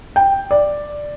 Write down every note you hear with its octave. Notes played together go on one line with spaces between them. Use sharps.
G5
D5